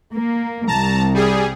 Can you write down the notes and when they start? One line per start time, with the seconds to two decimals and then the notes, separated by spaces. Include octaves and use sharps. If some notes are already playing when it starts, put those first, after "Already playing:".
0.13 A#3
0.67 C2 A5 A#5
1.14 G3 G#4